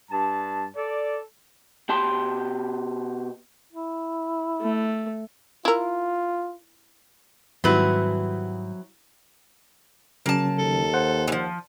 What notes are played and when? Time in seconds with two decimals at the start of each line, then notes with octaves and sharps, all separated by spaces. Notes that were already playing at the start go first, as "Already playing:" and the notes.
0.11 G2 A5
0.76 A4 D5
1.89 B2 G4 A5 C6
3.73 E4
4.61 A3
5.65 E4 F4 A#4
7.64 G#2 D#3 F#3 G3 C4 E4 F#4 B4
10.26 C#3 F#3 A#3 C#4 A5
10.58 D#2 A4
10.94 C5 F#5
11.28 E3 F3